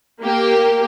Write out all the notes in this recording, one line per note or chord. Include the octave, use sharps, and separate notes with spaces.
A#3 G4